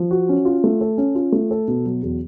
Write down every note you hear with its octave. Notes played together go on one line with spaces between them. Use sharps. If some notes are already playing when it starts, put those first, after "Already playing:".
Already playing: F3
F#4
C#4
F4
A3
A4
C#4
F4
A3
A4
B2
F#3
E2